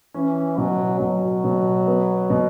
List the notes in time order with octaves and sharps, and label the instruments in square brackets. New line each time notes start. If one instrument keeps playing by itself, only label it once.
[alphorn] E3 [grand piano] C#4
[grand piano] B2 [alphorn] F#3
[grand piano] B2 [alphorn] F#3
[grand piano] B2
B3
B2